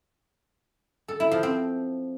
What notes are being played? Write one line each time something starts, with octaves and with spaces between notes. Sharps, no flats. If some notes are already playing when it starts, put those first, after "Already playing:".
A4
E4
F3
C4